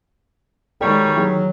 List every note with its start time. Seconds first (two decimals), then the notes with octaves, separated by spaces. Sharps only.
0.81 D#3 G3 G#3 F#4 A4 C#5 D5 G5
1.15 D#3 E3 F#3 G#4